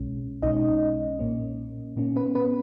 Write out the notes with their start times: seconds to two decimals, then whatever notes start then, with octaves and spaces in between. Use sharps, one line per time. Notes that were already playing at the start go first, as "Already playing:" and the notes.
Already playing: B1 B2 G#3 C#4
0.42 B1 B2 G#3 C#4 D#4 D#5
1.19 A#2 A#3 C#4
1.96 A#2 A#3 C#4
2.16 B3 B4
2.35 B3 B4